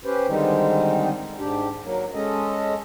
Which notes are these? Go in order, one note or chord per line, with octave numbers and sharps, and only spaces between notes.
C#4 G4 B4 C5
D3 D#3 G3 G#3 C4 D#4
G#2 D4 G4
F#3 A#3
G#3 C#4 A4 D#5